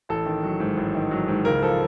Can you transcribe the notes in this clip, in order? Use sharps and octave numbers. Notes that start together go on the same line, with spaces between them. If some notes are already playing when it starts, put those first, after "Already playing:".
A1 A4
D#3
F#3
G#2
A1
D#3
F#3
G#2
C#2 A#4
F3 A4